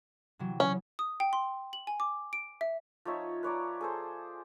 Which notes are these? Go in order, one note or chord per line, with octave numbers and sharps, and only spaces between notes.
C3 E3 F#3
C#3 C#4
D#6
G5
C6
F#7
G#5
D6
D7
E5
F3 D#4 C#5 E5
B4 C#5 D5 A#5
G#4 A4 C5